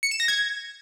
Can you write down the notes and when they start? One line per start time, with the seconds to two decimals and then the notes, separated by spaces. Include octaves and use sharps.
0.03 C#7
0.11 E7
0.20 A#6
0.28 G#6